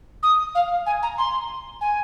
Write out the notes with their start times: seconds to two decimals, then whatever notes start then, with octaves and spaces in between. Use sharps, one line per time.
0.22 D#6
0.55 F5
0.86 G#5
1.02 A#5
1.18 C6
1.81 G#5